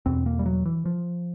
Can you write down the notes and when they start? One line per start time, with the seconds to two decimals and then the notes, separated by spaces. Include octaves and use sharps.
0.06 E2 B2 C4
0.26 A#3
0.39 G3
0.46 F#3
0.65 E3
0.85 F3